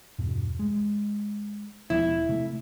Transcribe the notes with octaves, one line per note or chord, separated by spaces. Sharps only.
E2 G2 B2
G#3
E1 F3 B3 E4
C3 A3